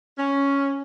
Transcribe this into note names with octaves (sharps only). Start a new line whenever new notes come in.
C#4